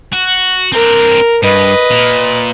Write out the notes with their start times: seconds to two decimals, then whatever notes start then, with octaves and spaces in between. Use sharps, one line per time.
0.13 F#4
0.72 C4 D4 A#4
1.43 G2 B4 D#5
1.91 A#2